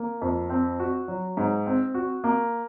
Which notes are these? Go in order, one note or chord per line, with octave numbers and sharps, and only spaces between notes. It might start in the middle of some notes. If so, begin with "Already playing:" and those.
Already playing: A#3
F2
C4
F#4
F#3
G#2
C4
F#4
A#3